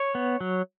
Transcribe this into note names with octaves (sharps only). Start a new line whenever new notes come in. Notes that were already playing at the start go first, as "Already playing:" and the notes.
Already playing: C#5
B3
F#3